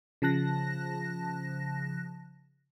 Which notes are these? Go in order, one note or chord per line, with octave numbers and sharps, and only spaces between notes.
C#3 F3 A5 F#6 A#6